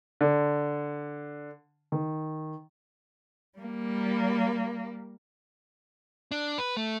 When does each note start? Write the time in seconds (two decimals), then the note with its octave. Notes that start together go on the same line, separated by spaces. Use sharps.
0.21 D3
1.92 D#3
3.58 G3 A#3
6.31 D4
6.58 B4
6.77 A3